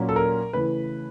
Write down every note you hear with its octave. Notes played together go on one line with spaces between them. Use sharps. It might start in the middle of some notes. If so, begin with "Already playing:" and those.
Already playing: A#2 F#3 A#3 C#4
A4
A#4
C#3 E3 A3 B4